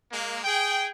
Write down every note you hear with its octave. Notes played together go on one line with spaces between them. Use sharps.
G#3 A#3
G#4 G5